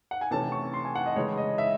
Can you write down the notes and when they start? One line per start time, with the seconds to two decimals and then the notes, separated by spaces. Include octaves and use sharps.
0.11 F#5
0.21 G#5
0.31 C3 E3 A3 C#4 A5
0.52 C#6
0.73 C6
0.85 G#5
0.95 F#5
1.06 D#5
1.16 C#3 E3 G#3 C#5
1.38 D#5
1.58 E5